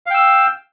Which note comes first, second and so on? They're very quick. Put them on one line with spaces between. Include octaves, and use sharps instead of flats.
F5 G5 E6